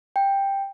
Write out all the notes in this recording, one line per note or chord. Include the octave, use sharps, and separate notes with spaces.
G5